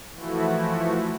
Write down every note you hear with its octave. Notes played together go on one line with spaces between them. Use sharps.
E3 F3 A3 E4 F#4